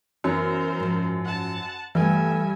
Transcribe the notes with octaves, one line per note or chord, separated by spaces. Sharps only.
F#2 E3 B3 A#4 C5 C#5
G#2 F3
F#5 A5
G2 E3 A3 G4 E5 G#5